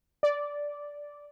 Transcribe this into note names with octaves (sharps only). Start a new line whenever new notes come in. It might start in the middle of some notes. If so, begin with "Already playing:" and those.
D5